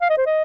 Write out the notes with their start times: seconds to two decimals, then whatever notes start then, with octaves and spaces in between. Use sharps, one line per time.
0.01 F5
0.10 D#5
0.17 C5
0.26 D#5